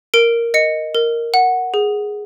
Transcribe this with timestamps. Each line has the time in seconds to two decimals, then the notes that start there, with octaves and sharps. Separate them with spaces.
0.14 A#4 D7
0.54 D#5 C#7
0.95 A#4
1.34 F#5
1.74 G#4